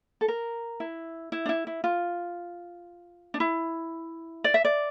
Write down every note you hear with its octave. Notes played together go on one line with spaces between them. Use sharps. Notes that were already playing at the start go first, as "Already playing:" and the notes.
A4
A#4
E4
E4
D4
E4
E4
F4
D4
E4
D5
E5
D5